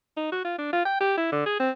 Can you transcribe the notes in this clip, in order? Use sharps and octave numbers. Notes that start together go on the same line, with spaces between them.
D#4
F#4
F4
D4
F4
G5
G4
E4
D3
G#4
C4